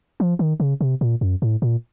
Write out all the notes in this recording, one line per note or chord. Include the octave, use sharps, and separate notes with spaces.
F3
D#3
C#3
C3
A#2
F#2
A2
A#2